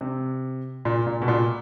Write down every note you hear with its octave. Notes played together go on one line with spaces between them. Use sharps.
C3
A#2
A#2
B2
A#2